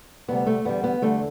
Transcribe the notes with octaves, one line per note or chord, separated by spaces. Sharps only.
D2 C3 G3 B3
A3
E2 D3 G3 B3
B3
E2 D3 G3 A3